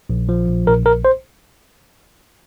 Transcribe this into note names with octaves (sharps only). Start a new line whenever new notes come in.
A#1
F3
A#1
A#1 A#4
A#1 A#4
C5